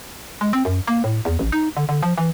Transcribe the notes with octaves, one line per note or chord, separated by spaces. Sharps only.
G#3
C4
F#2
A#3
A2
E2
A1
D#4
D3
D3
F3
E3